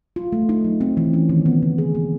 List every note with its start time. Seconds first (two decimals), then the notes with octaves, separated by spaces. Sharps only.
0.16 F4
0.32 A3
0.49 D#4
0.65 F#3
0.81 C4
0.97 E3
1.13 C#4
1.29 D#3
1.46 B3
1.62 C#3
1.78 G#4
1.95 A#3